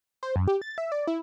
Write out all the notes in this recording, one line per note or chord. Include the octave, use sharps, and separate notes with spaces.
C5
F#2
G4
A6
E5
D5
E4